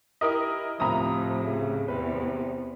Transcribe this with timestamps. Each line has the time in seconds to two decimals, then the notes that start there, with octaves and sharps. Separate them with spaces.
0.21 E4 G4 A#4 D#5
0.80 D2 A2 C3 F3 A#5 B5 D#6
1.43 C#3
1.88 E2 C3 B4